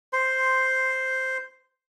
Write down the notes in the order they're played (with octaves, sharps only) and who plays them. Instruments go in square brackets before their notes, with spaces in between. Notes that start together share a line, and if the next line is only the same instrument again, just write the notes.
[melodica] C5 C6